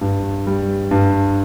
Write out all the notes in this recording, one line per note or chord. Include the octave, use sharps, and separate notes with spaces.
G2
G3
G2